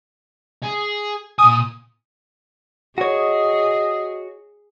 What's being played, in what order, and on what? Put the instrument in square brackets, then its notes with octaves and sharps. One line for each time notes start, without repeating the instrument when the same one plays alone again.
[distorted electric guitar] G#4
[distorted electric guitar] A#2 G#5 [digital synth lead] D#6
[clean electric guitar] F#4 C#5 [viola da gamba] G#4 [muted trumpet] D#5